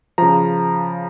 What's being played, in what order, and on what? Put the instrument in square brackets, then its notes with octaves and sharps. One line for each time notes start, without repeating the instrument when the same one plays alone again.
[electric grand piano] C#3 F3 A#5